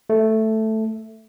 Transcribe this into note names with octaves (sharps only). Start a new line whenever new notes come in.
A3